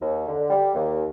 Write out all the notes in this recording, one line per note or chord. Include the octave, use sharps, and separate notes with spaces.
D#2
D3
G3
D#2